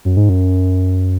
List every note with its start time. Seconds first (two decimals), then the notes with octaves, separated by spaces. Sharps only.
0.05 F#2
0.17 G#2
0.29 F#2